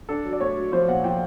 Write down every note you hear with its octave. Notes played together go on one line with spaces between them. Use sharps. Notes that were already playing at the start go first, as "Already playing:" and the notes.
D4 A4
F#3
D5
A3 C#5
F#3
F3 C5
A#2 F#5
F3 G5